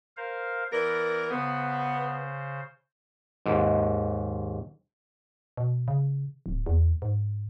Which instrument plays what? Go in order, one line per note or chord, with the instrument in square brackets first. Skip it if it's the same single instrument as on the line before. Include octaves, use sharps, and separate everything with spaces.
[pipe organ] A#4 C5 F5
[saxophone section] E3 B3 A#4 [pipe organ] D5 A#6
[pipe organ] C#3 C5 [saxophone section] B3
[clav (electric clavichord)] D#2 G#2
[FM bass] B2
C#3
D1
E2
G#2